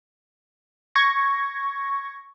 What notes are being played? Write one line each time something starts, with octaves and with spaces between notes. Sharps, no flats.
C#6 G#6 A#6